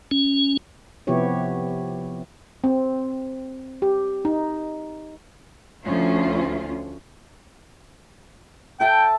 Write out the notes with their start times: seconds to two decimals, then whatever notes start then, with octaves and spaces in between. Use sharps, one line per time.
0.11 C#4
1.07 C3 F3 B3 E4 G4 C#5
2.64 C4
3.82 G4
4.25 D#4
5.84 D2 F3 A3 C#4 F4
8.80 A4 E5 G5 A5